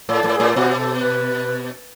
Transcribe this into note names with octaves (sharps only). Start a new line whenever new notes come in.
A2 A4
A2
G#4
A2
B2 F#4
A4
B4